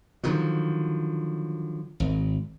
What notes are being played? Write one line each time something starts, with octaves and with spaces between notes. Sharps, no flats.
D3 D#3 F3 F#3
G#1